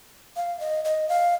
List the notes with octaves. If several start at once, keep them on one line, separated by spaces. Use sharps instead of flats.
F5
D#5
D#5
F5